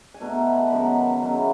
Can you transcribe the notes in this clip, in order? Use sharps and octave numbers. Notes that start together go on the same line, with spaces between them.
G#5
B2 A3 D#4 A5
B5
A5
B5
F#2 D#3 G#3 B3
C#3 F#3 C#4 E4